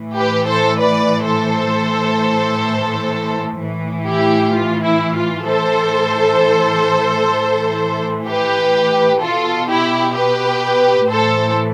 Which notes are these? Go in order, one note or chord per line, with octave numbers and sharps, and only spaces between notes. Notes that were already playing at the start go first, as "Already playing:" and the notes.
Already playing: A2 E3
G4 B4
A4 C5
B4 D5
A4 C5
A2 E3
A2 E3
E4 G4
F4
E4
F4
A2 E3 A4 C5
A2 E3
G4 B4
B2 F4 A4
E4 G4
G4 B4
A2 E3 A4 C5